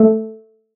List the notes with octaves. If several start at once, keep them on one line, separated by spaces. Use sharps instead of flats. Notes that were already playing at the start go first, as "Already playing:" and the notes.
Already playing: A3